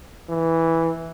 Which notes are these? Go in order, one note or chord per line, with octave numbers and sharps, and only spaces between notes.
E3